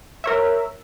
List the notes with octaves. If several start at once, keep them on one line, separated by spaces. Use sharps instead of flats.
A#4 C#5 E5